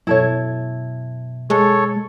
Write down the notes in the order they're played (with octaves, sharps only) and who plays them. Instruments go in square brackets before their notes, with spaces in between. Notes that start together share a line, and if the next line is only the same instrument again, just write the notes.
[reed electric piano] F#2 B2 [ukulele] E4 A4 C#5
[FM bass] G#3 [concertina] A4 C#5